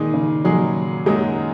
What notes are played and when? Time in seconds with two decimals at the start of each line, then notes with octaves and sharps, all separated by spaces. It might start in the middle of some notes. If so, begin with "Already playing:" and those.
Already playing: A#2 D#3 G#3 D#4 G#4
0.14 C#3
0.45 A#2 F#3 G#3 D#4 G#4
1.06 F#2 D#3 F#3 G#3 A#3 D#4